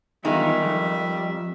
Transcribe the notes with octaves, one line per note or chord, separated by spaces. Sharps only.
E2 D#3 G3 G#3 D#4 F4 E5
F2